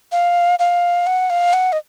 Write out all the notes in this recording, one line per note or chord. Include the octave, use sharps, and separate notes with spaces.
F5
F5
F#5
F5
F#5
D#5